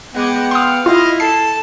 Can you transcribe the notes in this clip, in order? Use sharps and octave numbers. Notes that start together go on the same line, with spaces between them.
G#3 B3 F#5 G5 D6
F5 C6 D#6
E4 F4 D#5 F5
A4 A5 C7